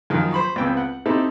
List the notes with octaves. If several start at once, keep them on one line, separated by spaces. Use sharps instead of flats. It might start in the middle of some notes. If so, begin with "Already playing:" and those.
F#2 D#3 F3
C5 B5 C#6
C#2 B3 C4 G5 E6
F#5
C4 D#4 E4 G4 A4